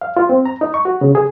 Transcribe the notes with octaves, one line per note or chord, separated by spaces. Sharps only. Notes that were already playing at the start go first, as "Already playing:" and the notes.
F5
F4
C4
A#5
D#4
C#6
F#4
C#3
G#4